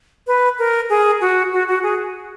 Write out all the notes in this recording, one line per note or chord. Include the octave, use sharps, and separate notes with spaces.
B4
A#4
G#4
F#4
F#4
F#4
G#4